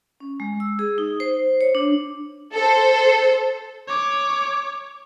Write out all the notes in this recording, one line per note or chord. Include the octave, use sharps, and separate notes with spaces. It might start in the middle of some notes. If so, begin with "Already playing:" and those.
C#4
G#3
E6
G#4
D#4
C5
C#5
D4
A4 C5
C#5 D6